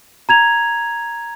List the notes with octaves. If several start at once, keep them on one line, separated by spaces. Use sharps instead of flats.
A#5 G#6 F7